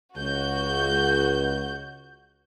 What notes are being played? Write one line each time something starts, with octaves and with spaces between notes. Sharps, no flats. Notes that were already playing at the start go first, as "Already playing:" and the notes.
C#2 F#4 G6